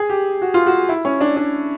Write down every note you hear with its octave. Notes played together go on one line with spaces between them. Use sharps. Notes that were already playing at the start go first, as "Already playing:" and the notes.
Already playing: G#4
G4
F#4
F4
F#4
E4
C#4
D4
D4